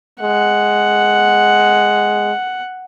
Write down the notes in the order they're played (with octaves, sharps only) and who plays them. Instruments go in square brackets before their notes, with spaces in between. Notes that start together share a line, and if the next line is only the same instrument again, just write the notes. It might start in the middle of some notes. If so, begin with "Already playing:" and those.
[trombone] G#3 [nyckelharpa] F#5